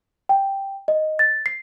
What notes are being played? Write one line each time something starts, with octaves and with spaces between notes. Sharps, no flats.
G5
D#5
A6
C7